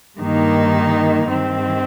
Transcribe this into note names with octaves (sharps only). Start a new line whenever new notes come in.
G2 D#3 A#3 D#4
G2 D#3 C4